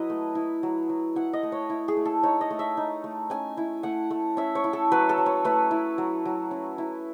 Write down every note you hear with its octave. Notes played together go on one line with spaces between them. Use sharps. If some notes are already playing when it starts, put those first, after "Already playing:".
Already playing: F#3 E4 B4 D#5
A3
E4
F#3
F#3
E4 F#5
D#5
A3
C#5
E4
G#4
A3
A4
D#4 C#5
D#5
A3
E5
D#4
A3
C#4 G#5
E4
A3 F#5
A3
C#4 E5
C#5
E4
A4
F#3 B4
A4
F#3
C#5
A3 B4
E4
F#3
F#3
C#4
E4